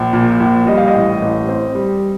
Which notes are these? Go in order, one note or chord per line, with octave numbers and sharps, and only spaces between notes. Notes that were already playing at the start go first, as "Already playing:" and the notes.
Already playing: A#1
A#2
A#1
G3 D#5
F5
D#5
A1
A1
C4
G3